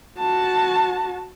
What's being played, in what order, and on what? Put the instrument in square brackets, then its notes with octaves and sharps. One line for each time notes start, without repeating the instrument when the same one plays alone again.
[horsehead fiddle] F#4 A5